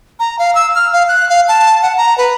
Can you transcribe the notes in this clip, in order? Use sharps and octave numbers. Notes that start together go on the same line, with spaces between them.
A#5
F5
E6
F6
F5
F#6
F5
A5
F#5
A#5
B4